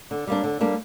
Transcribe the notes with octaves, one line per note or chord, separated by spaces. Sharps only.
D3
G3 A#3 D4
D3
G3 A#3 D4